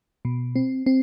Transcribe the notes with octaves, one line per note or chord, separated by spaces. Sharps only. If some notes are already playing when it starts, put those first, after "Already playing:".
B2
C4
C4